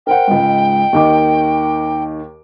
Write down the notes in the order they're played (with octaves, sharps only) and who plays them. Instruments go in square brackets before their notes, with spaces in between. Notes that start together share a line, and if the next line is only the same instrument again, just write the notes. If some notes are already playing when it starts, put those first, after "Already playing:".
[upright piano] A#4 C5 F#5 [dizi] G5
[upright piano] C#2 G#2
D#2 D#3 D6